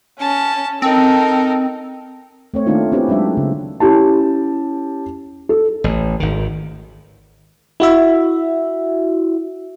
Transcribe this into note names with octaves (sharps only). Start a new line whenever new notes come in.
C#4 A5
C4 D#4 A4 A#4
A3 C4 C#5
D#3 A3 A#3 D4 D#4 F4
C4 C#4 E4 G4 B4 C5
F#3 G#3 C#4 D4 E5
C#3
C#4 E4 G4 A5
A4
A1
G#1 D#3
E4 F#4 E5